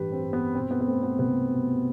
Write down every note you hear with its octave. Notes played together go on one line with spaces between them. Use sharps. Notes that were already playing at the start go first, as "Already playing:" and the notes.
Already playing: A1 G2 G3 G4 B4
C4
G2
B3
B2 C4
B3
B3
A3 C4
B3
C2 B3
B2